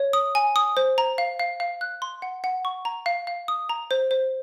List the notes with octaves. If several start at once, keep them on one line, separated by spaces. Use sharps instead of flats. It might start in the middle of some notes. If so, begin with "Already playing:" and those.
Already playing: C#5
D#6
G#5
D#6
C5
A#5
F5
F5
F5
F#6
C6
F#5
F#5
C#6
A#5
F5
F5
D#6
A#5
C5
C5